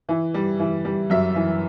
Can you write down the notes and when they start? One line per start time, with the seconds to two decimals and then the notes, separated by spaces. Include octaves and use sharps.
0.09 E3
0.34 G3
0.60 E3
0.85 G3
1.10 F#2 E5
1.36 E3